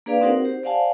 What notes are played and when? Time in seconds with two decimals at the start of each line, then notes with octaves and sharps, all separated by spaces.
0.06 A#3 D4 G#4 B4 D5 F5
0.21 C4 D#4 F#4 A#4 C5 F#5
0.45 G4 C5
0.63 C5 D5 F5 F#5 G#5 A5